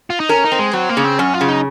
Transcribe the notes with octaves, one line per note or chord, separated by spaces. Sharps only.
F4
D#4
C#4 A#4
D#4
C4
G#3
F#3 C4
A#3
C#3
C4
F#2 C#4
F4
C#3
D#4